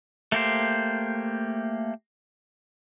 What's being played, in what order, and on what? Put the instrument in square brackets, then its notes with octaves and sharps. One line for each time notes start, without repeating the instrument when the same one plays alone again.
[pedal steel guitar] A3 A#3 G4 C5